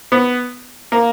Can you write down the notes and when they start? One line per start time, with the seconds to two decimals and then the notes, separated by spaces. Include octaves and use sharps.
0.12 B3
0.92 A#3